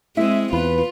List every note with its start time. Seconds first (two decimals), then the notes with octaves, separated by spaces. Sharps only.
0.17 G#3 C4 E4 E5
0.53 E2 F4 B4